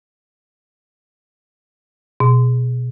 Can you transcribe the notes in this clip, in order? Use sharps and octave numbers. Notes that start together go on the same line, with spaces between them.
B2